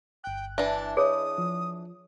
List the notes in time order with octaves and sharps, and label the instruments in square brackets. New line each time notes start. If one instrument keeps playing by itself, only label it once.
[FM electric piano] G1 F#6 [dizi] G5
[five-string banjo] E3 D4 [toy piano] E5 [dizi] A5
[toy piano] G#4 C#5 [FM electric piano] B4 D#5 E5 [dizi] D#6
[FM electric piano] F3